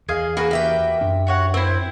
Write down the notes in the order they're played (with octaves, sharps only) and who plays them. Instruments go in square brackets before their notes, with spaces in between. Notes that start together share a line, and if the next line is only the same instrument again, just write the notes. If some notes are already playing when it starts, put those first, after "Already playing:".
[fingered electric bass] E2 [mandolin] G#4 D#5 F5
[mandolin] A#3 F#4 B4 [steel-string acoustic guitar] G#4
[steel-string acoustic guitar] G4 E5 G5
[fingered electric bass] F#2 D4
[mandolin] F#4 C#5 F#5
[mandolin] C4 E4 [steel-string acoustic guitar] C5